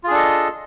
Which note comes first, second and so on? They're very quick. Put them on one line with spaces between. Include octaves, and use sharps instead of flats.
F4 G#4 D4 A4 D#5